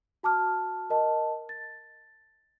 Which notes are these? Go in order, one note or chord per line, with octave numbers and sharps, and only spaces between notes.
F#4 A5 D6 F6
A#4 D#5 A5
A6